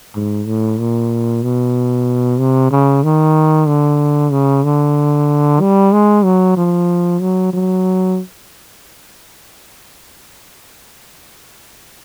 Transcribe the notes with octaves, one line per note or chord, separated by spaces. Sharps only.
G#2
A2
A#2
B2
C3
C#3
D#3
D3
C#3
D3
G3
G#3
F#3
F3
F#3
F#3